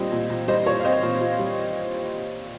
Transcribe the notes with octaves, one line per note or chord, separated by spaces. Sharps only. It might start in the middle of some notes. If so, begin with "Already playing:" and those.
Already playing: A#2 G3 C4 C5 D#5
A#2
A#2
G3 C5 D#5
A#2 C#5
F5
C4 C5 D#5
A#2
A#2
G3